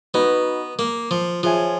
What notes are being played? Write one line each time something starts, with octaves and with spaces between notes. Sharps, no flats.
B3 D#4 F#4 B4 D#5
A#3
F3
F3 F4 G#4 C#5 E5 G#5